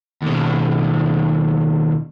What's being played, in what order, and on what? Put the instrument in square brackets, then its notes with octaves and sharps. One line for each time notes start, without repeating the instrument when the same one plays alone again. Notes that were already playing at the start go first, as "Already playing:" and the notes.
[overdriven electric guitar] D#2 B2